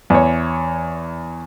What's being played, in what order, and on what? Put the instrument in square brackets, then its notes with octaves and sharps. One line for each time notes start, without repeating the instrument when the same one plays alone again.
[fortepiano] E2 C#5